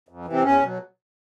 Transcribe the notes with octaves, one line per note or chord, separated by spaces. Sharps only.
F2
C3 E3
C4
E2 C#4
B2 F#3